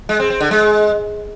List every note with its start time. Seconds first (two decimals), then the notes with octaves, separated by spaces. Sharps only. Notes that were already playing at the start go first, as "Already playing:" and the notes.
0.09 G#3
0.20 C4
0.30 C4
0.41 D3
0.51 G#3